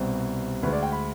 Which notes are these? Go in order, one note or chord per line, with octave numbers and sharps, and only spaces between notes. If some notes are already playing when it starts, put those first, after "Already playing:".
Already playing: C2 B2 G3 C4
D2 D3 G#3 B4
D5
G5
B5